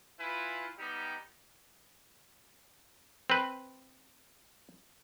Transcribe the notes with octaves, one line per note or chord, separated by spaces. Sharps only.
E4 F4 B4 G#5 B5
G3 B3 D#4 G4
C4 B4